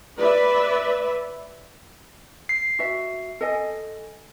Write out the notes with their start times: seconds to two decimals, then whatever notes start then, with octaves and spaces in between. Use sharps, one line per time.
0.18 B4 D5 E5
2.49 C7
2.79 F#4 E5
3.41 A4 D#5 G#5